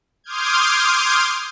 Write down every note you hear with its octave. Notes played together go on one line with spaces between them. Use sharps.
C6 D6 D#6 F6 G6 G#6